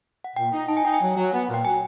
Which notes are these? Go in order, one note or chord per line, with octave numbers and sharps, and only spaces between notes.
F#5
A#2 G5
D#4
D#4 A5
G#5
D#4 G5
G#5
F#3
F#3
B3
A#2
G5
F#3 G#5